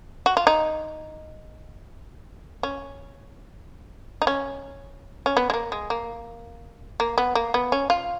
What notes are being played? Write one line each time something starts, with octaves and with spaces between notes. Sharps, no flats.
F#4
F4
D#4
C#4
D#4
C#4
C#4
B3
G#3
A#3
G#3
A#3
A#3
B3
A#3
B3
C#4
F4